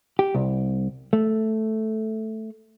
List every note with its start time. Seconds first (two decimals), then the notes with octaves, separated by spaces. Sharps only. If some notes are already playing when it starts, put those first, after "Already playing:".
0.19 G4
0.35 C2
1.13 A3